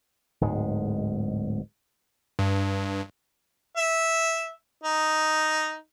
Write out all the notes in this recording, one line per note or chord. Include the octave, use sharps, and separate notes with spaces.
D1 G#2 G#3
G2
E5
D#4